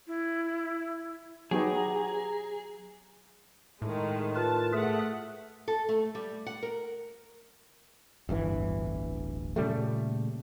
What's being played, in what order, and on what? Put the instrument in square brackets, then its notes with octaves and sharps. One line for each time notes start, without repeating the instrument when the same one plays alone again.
[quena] E4
[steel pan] F#3 B3 G4 [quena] D#4 [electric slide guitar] G#4
[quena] A#5
[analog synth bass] A2 [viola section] D#3 G#3
[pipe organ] F4 A#4 B4 [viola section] A5
[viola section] A3 F#5 [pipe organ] G#4 E5
[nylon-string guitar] A4
A3
G3
F#5
A#4
[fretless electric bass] D1 G1 G2 E3
A#2 C#3 G3 A3